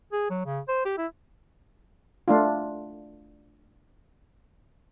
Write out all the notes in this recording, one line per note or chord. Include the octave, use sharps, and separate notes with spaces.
G#4
F#3
C#3
C5
G4
E4
A3 D4 F4